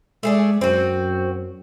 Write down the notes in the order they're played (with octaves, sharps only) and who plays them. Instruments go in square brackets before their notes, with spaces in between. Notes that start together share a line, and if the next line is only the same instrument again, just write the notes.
[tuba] G#3 [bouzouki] A3 G#4 D5
[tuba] F#2 [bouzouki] C4 F#4